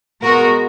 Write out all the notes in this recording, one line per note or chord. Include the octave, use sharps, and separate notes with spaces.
B2 G#3 F#4 A#4